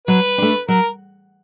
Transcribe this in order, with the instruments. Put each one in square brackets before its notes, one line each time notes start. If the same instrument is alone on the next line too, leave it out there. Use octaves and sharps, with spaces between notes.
[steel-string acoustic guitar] F#3 [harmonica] B4
[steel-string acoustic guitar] A3 D4
[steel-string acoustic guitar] F#3 [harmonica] A#4